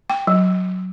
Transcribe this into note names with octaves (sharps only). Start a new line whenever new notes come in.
G5
F#3